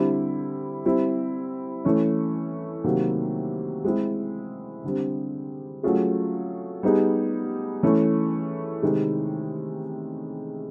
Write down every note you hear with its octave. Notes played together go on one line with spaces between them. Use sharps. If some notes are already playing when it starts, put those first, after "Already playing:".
Already playing: D3 G3 C4 E4
G3 C4 E4
E3 A3 C#4
C3 D#3 F#3 A#3
G#3 C4 E4
D3 G3 C4
F#3 A3 C#4 F4 G#4
G3 B3 D#4 G#4
E3 A3 C#4
C3 D#3 G#3